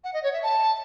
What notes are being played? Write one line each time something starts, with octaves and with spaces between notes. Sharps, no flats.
F#5
D#5
C#5
E5
A5